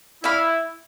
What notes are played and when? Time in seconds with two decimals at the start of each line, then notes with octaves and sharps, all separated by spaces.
0.24 E4 D5 F5 B5